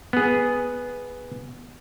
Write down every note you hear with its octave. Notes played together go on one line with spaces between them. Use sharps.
B3 G#4